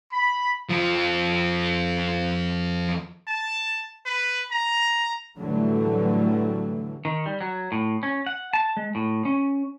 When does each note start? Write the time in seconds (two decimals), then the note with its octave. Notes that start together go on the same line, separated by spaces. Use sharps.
0.12 B5
0.70 F2 F3
3.28 A5
4.06 B4
4.51 A#5
5.38 A2 D3 E3 F#3 G3 A3
7.05 D#3
7.26 G3
7.41 F#3
7.72 A2
8.03 C#4
8.26 F#5
8.53 A5
8.77 G#3
8.95 A2
9.25 C#4